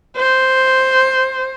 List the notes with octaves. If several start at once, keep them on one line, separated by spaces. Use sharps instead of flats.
C5